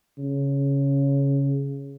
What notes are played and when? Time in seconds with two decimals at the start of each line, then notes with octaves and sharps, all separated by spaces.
0.18 C#3